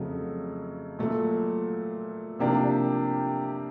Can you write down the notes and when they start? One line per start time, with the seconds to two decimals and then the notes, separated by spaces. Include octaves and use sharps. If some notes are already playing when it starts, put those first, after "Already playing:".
Already playing: F2 C#3 F#3 A3
0.99 A#2 F#3 A3
2.39 C3 F3 A#3 D4 G4